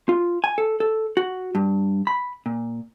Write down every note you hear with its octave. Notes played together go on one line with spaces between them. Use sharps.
F4
G#5
A4
A4
F#4
G2
B5
A#2